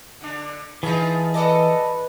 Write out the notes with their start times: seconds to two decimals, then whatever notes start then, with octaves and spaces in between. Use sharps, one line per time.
0.21 D3 D4
0.83 E3 D#4 F4 G#4 A5
1.34 A4 B4 D5 D#5 A5